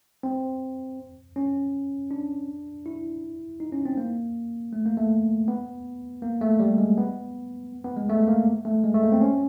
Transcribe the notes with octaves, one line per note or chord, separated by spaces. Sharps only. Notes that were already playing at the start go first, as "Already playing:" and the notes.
C4
C#4
D4
E4
D#4
C#4
C4
A#3
A3
A#3
A3
B3
A#3
A3
G3
G#3
B3
B3
G#3
A3
A#3
A3
G#3
A3
A#3
C4
C#4